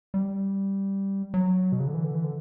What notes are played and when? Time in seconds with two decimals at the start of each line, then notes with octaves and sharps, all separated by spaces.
0.14 G3
1.34 F#3
1.72 B2
1.80 C#3
1.87 D3
1.94 E3
2.04 D3
2.14 E3
2.24 D3